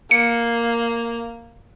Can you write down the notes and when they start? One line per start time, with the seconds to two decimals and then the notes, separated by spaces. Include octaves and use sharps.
0.11 A#3 C#7